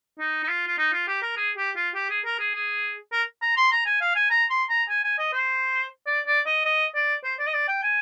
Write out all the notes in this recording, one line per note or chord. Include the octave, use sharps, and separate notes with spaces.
D#4
D#4
F4
F4
D#4
F4
G4
A#4
G#4
G4
F4
G4
G#4
A#4
G#4
G#4
A#4
A#5
C6
A#5
G#5
F5
G#5
A#5
C6
A#5
G#5
G#5
D#5
C5
D5
D5
D#5
D#5
D5
C5
D5
D#5
D5
G5
G#5